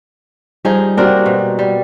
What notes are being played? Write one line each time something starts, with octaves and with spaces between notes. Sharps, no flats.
F3 G3 D#4 G#4
A#3 C4 D4 F#4 G4 A#4
B2
G3